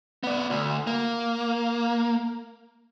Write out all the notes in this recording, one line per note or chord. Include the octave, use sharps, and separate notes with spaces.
B3 D5
D2
A#3